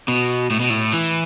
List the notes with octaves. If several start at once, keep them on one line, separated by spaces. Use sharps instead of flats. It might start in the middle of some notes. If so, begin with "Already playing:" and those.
B2
A2
B2
A2
E3